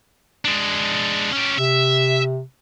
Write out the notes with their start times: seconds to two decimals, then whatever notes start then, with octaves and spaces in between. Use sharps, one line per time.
0.45 G#3 D4
1.32 C#4 G4
1.58 C3 E5